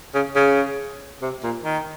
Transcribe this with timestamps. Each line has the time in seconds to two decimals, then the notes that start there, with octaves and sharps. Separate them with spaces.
0.15 C#3
0.36 C#3
1.22 C3
1.43 A#2
1.65 D#3